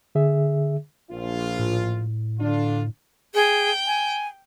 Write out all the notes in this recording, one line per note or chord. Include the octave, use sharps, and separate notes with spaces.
D3 G#4 E5
A#1 F4
A2
D3 D4 F4
G#4 G5
G#5